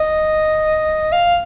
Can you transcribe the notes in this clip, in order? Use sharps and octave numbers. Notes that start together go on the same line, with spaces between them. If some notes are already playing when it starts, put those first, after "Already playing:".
Already playing: D#5
F5